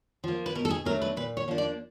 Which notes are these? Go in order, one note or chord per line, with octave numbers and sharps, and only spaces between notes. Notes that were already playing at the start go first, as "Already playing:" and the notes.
F3 A#3
B4
B2 A#4
A4
G#4
F#3 A3 D4 A#4
B4
A#2 B4
C#5
F3 A#3 D4
D5